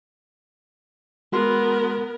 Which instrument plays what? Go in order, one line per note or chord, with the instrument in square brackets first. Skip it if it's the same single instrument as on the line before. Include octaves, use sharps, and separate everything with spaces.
[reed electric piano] G#3 F#4 C6 [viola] B3 A#4